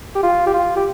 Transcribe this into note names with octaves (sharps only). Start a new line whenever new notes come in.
G4
F4
G4
F4
G4